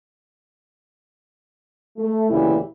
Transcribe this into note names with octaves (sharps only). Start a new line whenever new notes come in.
A3
D2 A#2 C#3 E3 E4 G4